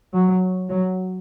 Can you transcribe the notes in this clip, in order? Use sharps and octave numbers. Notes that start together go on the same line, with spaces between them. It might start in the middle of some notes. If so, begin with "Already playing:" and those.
F#3
F#3